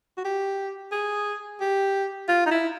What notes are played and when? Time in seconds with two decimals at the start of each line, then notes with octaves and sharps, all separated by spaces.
0.17 F#4
0.25 G4
0.92 G#4
1.61 G4
2.28 F4
2.46 D#4
2.51 E4